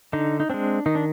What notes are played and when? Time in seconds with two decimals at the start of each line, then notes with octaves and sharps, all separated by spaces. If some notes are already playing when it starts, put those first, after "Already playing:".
0.13 D3 D#4
0.40 D#4
0.50 G#3 C4 D4
0.86 D#3 D#4
0.95 D4